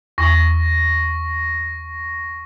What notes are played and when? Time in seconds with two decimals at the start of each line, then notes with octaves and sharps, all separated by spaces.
0.18 E2 C#6 A#6